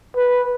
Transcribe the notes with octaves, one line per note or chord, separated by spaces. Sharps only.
B4